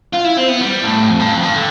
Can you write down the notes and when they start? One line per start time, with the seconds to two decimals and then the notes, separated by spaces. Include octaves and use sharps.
0.13 F4
0.24 E4
0.37 C4
0.48 B3
0.61 G3
0.83 A2
1.08 F2
1.20 G2
1.32 F2
1.43 G2
1.55 D3